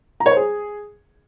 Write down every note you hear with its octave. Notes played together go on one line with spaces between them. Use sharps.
A#5
C#5
C5
G#4